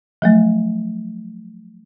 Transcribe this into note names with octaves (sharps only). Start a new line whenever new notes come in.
F3 F#3 A3